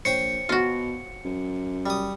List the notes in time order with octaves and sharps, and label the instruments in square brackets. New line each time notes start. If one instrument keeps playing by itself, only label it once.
[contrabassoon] A#1 [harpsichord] C5 C#5 G5 [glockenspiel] C#7
[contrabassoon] B2 [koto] F4 F#4
[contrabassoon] F#2
[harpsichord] G3 D#6